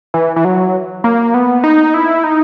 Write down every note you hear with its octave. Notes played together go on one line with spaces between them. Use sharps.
E3
E3
F#3
A#3
B3
D#4
E4
D#4